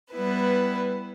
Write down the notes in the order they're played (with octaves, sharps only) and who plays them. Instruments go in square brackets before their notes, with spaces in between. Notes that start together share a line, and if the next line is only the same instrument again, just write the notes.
[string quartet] G3 B3 E4 B4